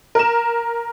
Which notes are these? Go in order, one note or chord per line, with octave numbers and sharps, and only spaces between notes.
A#4 E7